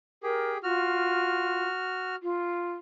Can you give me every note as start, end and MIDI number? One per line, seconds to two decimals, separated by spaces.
0.23 0.58 67
0.23 0.58 68
0.23 0.51 70
0.63 1.65 65
0.63 2.16 66
0.63 2.16 89
2.23 2.72 65